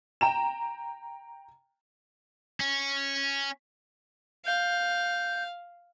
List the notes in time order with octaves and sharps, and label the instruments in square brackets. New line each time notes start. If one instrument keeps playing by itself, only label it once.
[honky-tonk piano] G5 A#5 E7
[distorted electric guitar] C#4
[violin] F5 [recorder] G6